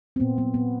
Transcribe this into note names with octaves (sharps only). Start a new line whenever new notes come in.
C4
A#2 B3
F#3 B3
A#2 B3